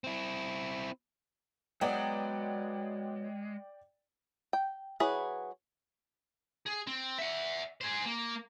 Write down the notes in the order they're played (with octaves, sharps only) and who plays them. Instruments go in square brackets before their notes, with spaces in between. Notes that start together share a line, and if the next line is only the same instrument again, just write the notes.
[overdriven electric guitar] C4 E4
[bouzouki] F#3 B3 [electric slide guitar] G#3 [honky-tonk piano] D5 G5
[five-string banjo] G5
F#3 E4 F#4 G#4 B4
[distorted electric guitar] G#4
C4
E5 F#5
G#4 C5
A#3